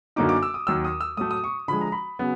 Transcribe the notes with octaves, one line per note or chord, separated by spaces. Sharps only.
F#2 D3 F#3 A#3 D#4 D6
D6
E6
D#6
D#2 D#3 F#3 E6
D#6
E6
A2 F#3 A3 D#6
D#6
C#6
D3 F3 G#3 B5
A#5
B5
C#3 F#3 B3